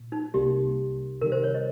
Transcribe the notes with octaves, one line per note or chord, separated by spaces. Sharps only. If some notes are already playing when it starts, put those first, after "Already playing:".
Already playing: A#2
D#4
C2 C3 G3 A#3 G4
C3 D#3 G3 A#4
C5
C#5
D#5